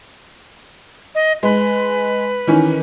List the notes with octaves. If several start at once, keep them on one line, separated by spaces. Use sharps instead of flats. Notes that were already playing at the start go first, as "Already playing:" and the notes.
D#5
G#3 B4
D#3 E3 C#4